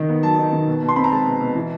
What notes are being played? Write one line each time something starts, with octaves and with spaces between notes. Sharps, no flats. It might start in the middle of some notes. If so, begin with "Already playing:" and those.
Already playing: D#3 D#4
B3
F#3 A5
D#4
D#3
B2
B2
C6
C4 B5
A#5
G#3 A5
B2
B2
E3